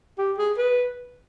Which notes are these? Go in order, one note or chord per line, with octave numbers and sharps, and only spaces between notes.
G4
G#4
B4